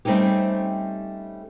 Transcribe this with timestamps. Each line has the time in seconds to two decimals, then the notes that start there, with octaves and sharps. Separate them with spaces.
0.05 G3 A3 C4 C#4 D#4 G4